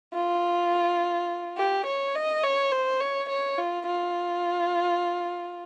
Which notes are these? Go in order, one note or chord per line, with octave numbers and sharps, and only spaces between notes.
F4
G4
C#5
D#5
C#5
C5
C#5
C#5
F4
F4